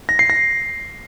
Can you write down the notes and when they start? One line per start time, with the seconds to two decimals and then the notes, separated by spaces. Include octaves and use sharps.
0.09 A#6
0.19 C7
0.30 A#6